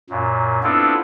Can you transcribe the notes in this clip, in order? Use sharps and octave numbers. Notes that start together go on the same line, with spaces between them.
F#2 A#2
B3 C4 D4 E4 F4 A4